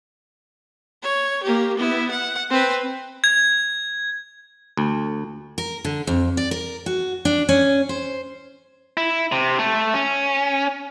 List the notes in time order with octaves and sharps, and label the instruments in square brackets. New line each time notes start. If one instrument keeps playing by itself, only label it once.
[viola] C#5
A#3 G4
B3 E4
F#5
C4 B4
[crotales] G#6
[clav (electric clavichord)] D2
[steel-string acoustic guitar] A#4
D3
F2
D5
A#4
F#4
D4
C#4
C5
[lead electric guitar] E4
C3
A3
C#4